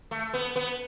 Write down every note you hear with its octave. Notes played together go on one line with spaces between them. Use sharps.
A3
B3
B3